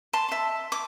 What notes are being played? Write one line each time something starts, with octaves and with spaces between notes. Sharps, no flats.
A5 C6
E5 C6
D6